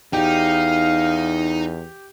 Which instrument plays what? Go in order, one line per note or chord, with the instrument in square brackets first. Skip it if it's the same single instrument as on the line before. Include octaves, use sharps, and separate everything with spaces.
[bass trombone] E2 [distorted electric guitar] D#4 [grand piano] G4 [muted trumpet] F5